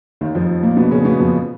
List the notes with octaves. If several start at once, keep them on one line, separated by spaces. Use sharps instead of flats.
D#2 D#3
F2 F3
A#2 A#3
B2 B3
C#3 C#4
B2 B3
F2 F3